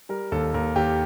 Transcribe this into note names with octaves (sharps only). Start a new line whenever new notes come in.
G3 A#4
D#2 A4
D#2 A#4
D#2 G4